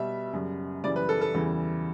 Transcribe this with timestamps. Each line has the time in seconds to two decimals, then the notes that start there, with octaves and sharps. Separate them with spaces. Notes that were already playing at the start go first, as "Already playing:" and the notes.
Already playing: B2 G3 E5
0.33 F#2 C#3 G3
0.84 F#2 C#3 E3 G3 D5
0.96 B4
1.09 A4
1.21 A4
1.35 E2 C#3 E3 G3